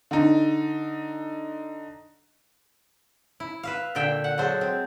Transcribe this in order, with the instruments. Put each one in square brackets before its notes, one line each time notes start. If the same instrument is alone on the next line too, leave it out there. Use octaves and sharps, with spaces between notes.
[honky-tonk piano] D3 D#4
[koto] E4
B4 E5 F5
A#2 D3 E5 G5
F#5
F#3 G#3 A4 C5
C4